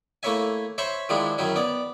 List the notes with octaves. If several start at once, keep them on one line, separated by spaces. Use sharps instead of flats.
A3 A#3 E4 C#5 E5 G#5
C5 C#5 E5 B5 C#6
D#3 F3 G#3 D4 E4
F#2 D#3 F#3 C#4 E4
B3 D5